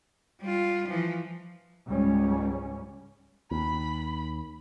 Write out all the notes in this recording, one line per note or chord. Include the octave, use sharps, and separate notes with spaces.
G3 F4
E3 F3
C#2 G#2 G3 C#4
D#2 B5